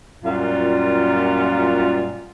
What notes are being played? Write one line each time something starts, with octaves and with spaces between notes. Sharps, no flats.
F#2 A#2 G3 F4